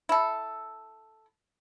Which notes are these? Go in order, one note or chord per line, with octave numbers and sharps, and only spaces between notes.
E4 A4